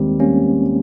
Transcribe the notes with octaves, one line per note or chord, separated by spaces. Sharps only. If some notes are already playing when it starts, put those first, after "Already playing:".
Already playing: D#2 G3 G#3 C4
G3 A#3 C#4